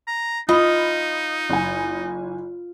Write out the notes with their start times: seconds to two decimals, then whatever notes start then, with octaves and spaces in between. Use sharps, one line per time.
0.07 A#5
0.49 D#4 F4 D#5 B5
1.50 F#1 G#5